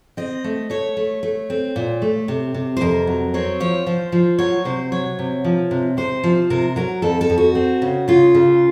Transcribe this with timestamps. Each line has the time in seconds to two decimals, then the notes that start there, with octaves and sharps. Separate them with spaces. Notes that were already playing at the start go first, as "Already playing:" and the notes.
0.17 C4 D#5
0.44 A3
0.70 A3 C#5
0.97 A3
1.23 A3
1.50 C4
1.76 A#2
2.02 A3
2.28 C3
2.54 C3
2.77 C5
2.81 F2 A#4
3.07 F#3
3.34 C4 C#5
3.60 F3 C#5
3.86 F3 C5
4.12 F3
4.38 F#3 C#5
4.65 C3 C5
4.92 F#3 C#5
5.19 C3
5.44 F3
5.71 C3
5.97 C3 C5
6.24 F3
6.50 C3 A#4
6.76 F#3 A#4
7.02 F2 A4
7.21 A4
7.30 F2
7.38 F#4
7.55 C4
7.82 C#3
8.08 C#3 F4
8.35 C#3